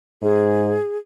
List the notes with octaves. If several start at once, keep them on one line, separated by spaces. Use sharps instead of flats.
G#2 G#4